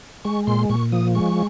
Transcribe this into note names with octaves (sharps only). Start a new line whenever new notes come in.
G#3 C#6
A#2 C6
A#2 C#6
F3 D#6
G#3 C#6